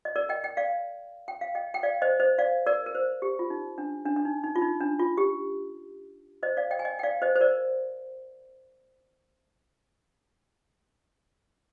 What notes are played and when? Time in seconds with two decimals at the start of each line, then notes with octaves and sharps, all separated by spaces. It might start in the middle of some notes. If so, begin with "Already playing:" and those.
0.05 D#5
0.16 A#4 D5
0.29 D#5 G5
0.44 D#5 G5
0.57 D5 F5
1.28 G5
1.41 F5
1.55 D#5 G5
1.74 G5
1.83 D5 F5
2.02 C5 D#5
2.20 C5 D#5
2.38 D5 F5
2.66 A#4 D5
2.86 A#4
2.95 C5
3.22 G4
3.39 F4
3.50 D#4
3.78 D4
4.06 D4
4.16 D4
4.25 D#4
4.44 D#4
4.56 F4
4.62 D#4
4.80 D4
4.99 F4
5.18 G4
6.43 C5 D#5
6.57 D5 F5
6.71 D#5 G5
6.79 G#5
6.85 D#5 G5
6.99 G5
7.03 D5 F5
7.22 C5 D#5
7.35 C5
7.41 A#4 D5